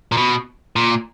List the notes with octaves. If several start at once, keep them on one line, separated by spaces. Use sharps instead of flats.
A#2
B2
A#2